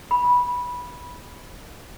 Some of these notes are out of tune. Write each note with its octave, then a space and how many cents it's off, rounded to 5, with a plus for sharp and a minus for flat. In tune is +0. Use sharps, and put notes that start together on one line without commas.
B5 -10